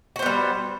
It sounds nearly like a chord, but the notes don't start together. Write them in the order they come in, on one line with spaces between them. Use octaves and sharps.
F#4 C5 B3 G3